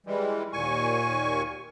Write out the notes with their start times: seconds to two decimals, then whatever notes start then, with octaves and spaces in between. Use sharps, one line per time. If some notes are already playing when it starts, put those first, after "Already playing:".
0.06 E3 G3 G#3
0.53 D#2 A#2 G#5 C#6